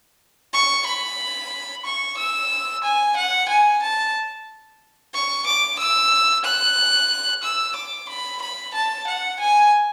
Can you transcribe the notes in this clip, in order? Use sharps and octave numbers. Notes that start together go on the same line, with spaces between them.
C#6
B5
C#6
E6
G#5
F#5
G#5
A5
C#6
D6
E6
F#6
E6
D6
B5
B5
A5
F#5
G#5